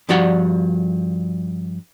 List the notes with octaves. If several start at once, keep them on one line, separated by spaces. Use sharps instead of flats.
G2 F3 F#4 D5 F#5